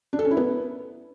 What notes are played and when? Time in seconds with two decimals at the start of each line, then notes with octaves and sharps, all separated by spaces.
0.13 D4
0.19 A4
0.25 C#4
0.31 E4
0.37 B3